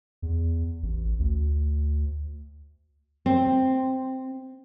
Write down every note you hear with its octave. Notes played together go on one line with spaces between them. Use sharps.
E2
A1
D2
C4